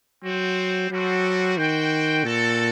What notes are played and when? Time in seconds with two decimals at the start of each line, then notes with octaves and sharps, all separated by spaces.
0.23 F#3 C4 F#4 C5
0.91 F#3 G3 C4 F#4 A4 C5
1.57 D#3 F#4 C5 G5
2.24 A#2 C4 F#4 A4